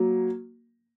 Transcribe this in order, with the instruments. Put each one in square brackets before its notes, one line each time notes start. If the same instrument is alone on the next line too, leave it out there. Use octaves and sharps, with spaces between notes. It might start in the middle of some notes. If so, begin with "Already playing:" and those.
Already playing: [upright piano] F#3 A#3